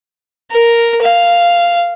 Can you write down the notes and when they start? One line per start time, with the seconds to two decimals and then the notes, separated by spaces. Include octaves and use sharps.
0.51 A#4
1.02 F5